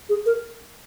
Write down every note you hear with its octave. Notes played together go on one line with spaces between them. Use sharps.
G#4
A#4